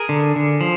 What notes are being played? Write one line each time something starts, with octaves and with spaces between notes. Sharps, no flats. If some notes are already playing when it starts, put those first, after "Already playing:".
Already playing: G#4 A#4
D3
D3
F3